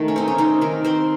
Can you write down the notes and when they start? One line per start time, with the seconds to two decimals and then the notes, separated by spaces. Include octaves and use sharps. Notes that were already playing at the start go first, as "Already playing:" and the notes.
Already playing: D#3 A3
0.08 C#4
0.16 C4 D#4
0.28 C#4
0.38 C4 D#4
0.61 D#3 A#4
0.84 C4 C5